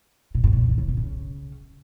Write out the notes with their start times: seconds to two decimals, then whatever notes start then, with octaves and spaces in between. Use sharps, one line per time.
0.35 A#2
0.44 G#2
0.53 A#2
0.68 D#3
0.78 C#3
0.88 C3
0.97 C#3